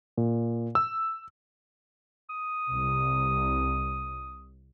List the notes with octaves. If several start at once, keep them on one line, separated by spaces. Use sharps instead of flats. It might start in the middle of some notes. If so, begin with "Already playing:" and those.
A#2
E6
D#6
C2